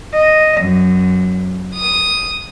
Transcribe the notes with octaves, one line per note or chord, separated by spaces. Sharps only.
D#5
F#2
D#6